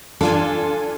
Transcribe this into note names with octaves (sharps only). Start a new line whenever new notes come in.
D4 F4 A4 G#5